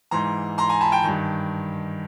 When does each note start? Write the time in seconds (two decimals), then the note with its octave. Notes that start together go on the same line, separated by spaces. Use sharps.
0.11 G#2 E3 A#5 C6
0.58 A#5 C6
0.69 G#5 A#5
0.81 A5 B5
0.92 G5 A5
1.04 G2 D#3